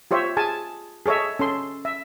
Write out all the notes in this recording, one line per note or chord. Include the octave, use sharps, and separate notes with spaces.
F4 G4 C5 C#5 E5
G#4 G#5 A5
G#4 A4 C#5 D#5 E5
C#4 A4 C6
E5